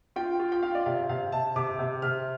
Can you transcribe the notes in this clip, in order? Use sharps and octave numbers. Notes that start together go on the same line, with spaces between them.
F4 G5
F4
G5
F4 F5
D5
C3 F5
C3 F5
C3 A5
C3 D6
C3
C3 F6